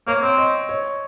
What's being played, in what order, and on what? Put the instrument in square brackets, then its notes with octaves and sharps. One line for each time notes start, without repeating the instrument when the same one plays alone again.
[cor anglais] A#3 [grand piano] C#5
[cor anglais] C4 [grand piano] C#5
[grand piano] D#5
C#5